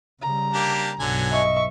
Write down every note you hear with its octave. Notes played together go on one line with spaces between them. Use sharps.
C#3 G3 A#5
A#3 D4 G4
B1 G2 D3 F#3 G#5
D#5 E5 C#6